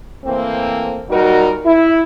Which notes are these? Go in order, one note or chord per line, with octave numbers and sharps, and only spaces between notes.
E3 A3 A#3 C4
A#2 F#3 G3 D#4 F#4 A#4
E4